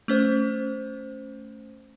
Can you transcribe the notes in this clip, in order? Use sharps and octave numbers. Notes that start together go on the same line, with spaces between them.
A3 C#4 C5